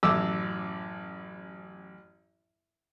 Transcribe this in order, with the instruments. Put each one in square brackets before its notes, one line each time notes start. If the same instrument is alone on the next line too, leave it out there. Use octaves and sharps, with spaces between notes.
[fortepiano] A1 F#2 D6 E6